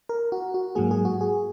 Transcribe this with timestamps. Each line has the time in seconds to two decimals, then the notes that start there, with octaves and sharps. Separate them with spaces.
0.09 A#4
0.32 F#4
0.54 F#4
0.75 G#2 F#3 A#3 G#4
0.91 G#4
1.05 F#4
1.21 G#4